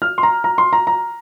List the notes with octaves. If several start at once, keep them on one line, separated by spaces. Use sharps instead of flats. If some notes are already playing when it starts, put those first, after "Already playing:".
F6
C6
A#5
A#5
C6
A#5
A#5